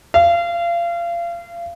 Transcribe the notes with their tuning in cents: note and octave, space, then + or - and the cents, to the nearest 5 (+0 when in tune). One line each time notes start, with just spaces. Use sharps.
F5 -30